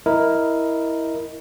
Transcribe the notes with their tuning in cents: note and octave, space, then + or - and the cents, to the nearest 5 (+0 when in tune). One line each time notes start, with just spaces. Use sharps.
E4 -10 A#4 +0 D#5 +0